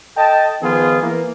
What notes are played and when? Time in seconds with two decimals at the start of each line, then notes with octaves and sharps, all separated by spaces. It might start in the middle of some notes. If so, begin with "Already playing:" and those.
0.16 A4 D#5 G5 A5
0.61 D#3 F3 B3 F4 G#4
1.02 E3 A#3